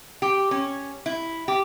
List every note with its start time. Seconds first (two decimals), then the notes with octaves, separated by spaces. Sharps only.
0.22 G4
0.51 C#4
1.06 E4
1.48 G4